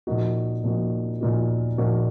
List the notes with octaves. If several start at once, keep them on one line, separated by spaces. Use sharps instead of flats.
A#2 F3 A#3 D#4 F#4
A#2 F3 A#3 D#4 F#4
A#2 F3 A#3 D#4 F#4
A#2 F3 A#3 D#4 F#4